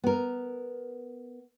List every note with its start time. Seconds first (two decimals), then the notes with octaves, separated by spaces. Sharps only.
0.04 B3 A#4